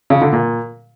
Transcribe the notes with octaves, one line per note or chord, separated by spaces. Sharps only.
C#3
D3
A#2